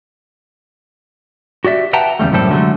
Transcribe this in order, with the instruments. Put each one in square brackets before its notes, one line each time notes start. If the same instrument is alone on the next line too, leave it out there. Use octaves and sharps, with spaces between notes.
[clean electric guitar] F#4 G4 D5 E5
B4 E5 F#5 G5 A5 A#5
E2 C#3 G3 A3
C2 F#2 A2 G3 C4 A4
D3 F#3 G#3 A3